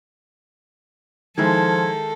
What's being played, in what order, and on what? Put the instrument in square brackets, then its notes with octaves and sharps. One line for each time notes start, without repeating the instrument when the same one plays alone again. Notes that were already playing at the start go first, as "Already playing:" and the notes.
[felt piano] D#3 G#3 E4 [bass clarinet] F3 [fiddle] A4 [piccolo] G#6